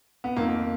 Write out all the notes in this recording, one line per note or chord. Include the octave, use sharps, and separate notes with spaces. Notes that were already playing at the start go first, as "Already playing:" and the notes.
B3
F2 D#3 A#3